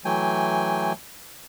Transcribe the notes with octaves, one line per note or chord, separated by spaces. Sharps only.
E3 F#3 A3 G5 G#5